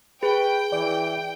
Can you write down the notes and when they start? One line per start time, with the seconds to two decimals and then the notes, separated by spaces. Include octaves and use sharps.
0.23 G#4 B4 G5
0.72 E3 D5